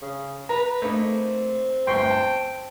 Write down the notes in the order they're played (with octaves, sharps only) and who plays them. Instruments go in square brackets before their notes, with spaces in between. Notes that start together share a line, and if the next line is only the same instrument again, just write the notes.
[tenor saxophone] C#3
[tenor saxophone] B4 [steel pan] A#5
[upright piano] A3 A#3 D#4 [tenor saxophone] C4
[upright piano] G1 D2 [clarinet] G5 [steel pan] C6 C#6
[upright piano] A5